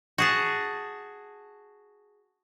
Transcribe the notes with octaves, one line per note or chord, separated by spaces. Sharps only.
F#4 G#4 A5